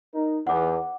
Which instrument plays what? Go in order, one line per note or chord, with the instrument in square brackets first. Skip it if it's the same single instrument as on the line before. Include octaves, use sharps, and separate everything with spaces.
[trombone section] D#4 A#4
[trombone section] E2 [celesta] F#5 D6